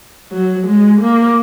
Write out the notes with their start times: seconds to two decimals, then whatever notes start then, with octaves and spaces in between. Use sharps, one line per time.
0.31 F#3
0.67 G#3
1.01 A#3